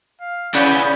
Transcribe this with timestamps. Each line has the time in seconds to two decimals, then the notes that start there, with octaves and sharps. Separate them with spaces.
0.21 F5
0.55 C#3 E3 B3 D5 G6